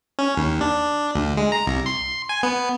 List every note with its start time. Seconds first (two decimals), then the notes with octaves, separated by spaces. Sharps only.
0.19 C#4
0.37 D#2
0.61 D4
1.15 D2
1.37 G#3
1.52 A#5
1.67 C2
1.86 C6
2.29 G#5
2.43 B3